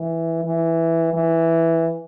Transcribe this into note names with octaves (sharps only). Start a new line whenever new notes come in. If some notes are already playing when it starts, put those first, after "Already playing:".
Already playing: E3
E3
E3